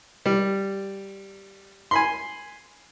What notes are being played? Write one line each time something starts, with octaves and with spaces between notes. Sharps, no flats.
G3
G#5 B5 C6